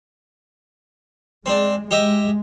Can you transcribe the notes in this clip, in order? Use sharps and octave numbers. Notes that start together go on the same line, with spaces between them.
G#3 C4 D4
G#3 G4 D#5 E5